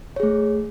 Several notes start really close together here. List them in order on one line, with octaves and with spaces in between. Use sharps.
C#5 G#4 A3